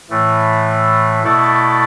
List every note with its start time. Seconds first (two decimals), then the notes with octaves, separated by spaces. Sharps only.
0.10 A2 E3 A3
1.23 B2 A3 E4 A4 D5